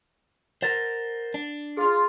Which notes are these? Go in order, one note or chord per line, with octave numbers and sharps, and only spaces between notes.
A#4 C5 F#5 A6 A#6
D4
F4 G#4